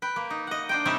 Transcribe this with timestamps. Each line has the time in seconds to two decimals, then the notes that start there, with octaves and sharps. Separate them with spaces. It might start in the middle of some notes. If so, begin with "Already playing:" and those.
0.02 B4 G5
0.16 A#3
0.30 D#4
0.47 D#5 F#5
0.69 D4 C5 G5
0.85 C3 G3 C4 D#4 C#5 E5